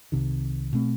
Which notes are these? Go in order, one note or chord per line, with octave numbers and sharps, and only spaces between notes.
C2 C3 D#3
B2 A3 C4